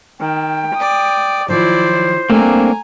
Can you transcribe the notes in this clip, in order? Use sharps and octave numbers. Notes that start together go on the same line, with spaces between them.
D#3 G5
D5 D#6
D#3 F3 F#3 E4 C5 D5
G3 A3 A#3 C4 D4 G#5 A#5